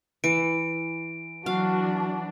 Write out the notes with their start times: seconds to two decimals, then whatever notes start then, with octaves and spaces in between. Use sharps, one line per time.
0.24 E3 D7
1.46 E3 F#3 D4 F#4 F5